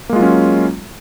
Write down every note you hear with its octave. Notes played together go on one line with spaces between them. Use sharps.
F#3 G#3 A#3 C#4 F4